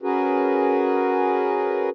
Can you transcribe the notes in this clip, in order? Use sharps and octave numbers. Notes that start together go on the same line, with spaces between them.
C#4 F#4 G#4 A#4 B4